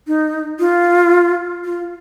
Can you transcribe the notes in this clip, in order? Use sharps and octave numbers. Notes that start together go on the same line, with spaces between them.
D#4
F4
F4